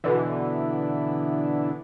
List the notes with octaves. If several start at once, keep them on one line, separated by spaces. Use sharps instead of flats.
B2 D3 E3